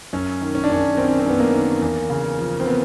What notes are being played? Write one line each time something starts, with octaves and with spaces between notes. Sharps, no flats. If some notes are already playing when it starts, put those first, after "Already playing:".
F#2 C#4
D#3
C#4
D4
F#2 C#4
D#3 C4
C#4
C4
F#2 B3
A#3
D#3
E2
C#3
F3
C4
B3